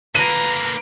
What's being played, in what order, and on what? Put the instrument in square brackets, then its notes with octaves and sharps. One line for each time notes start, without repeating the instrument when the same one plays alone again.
[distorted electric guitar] D3 A#3 [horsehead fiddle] B4 A#5 [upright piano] D#7